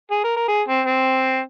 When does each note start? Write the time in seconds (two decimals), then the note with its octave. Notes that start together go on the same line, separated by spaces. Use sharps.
0.11 G#4
0.24 A#4
0.36 A#4
0.48 G#4
0.68 C4
0.87 C4